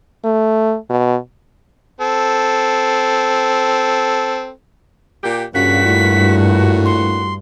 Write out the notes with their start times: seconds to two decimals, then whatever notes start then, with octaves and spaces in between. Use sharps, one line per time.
0.24 A3
0.90 B2
2.01 C4 A4
5.23 A#2 G4
5.55 G2 A#2 C#3 F#4 B6
5.86 A2
6.85 C6